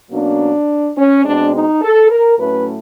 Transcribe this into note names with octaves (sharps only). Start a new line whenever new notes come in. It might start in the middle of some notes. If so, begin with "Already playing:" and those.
B2 F#3 A#3 C#4 D4
C#4
B2 G#3 C4 D4
D#4
A4
A#4
A2 F#3 A3 C#4 B4